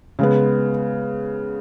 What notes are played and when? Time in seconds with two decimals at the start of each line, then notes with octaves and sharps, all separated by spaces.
0.19 C#3 G#3 B3